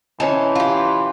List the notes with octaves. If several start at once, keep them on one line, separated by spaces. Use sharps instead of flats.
E3 C#4 D#4 C#5 A5 C6
F4 G4